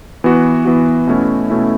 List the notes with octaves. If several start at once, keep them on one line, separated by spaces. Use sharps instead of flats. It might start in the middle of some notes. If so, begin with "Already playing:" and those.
E3 B3 F#4
E3 B3 F#4
B2 A3 C#4 E4
B2 A3 C#4 E4